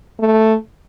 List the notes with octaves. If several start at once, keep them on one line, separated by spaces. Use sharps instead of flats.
A3